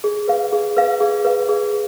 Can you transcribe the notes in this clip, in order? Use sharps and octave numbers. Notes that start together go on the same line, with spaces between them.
G#4
B4 F5
G#4
B4 F5
G#4
B4 F5
G#4